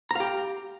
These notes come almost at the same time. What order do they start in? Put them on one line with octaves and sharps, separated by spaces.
A#5 F5 G4